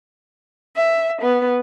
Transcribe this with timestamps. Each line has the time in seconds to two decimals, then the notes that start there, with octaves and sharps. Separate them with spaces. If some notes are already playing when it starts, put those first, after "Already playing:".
0.76 E5
1.21 B3